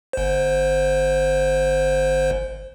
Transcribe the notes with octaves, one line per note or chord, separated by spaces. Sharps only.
G1 C5